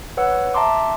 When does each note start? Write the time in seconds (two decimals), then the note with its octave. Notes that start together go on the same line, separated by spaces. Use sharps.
0.17 B4 C#5 F#5 E6
0.54 E5 A5 A#5 C6 D6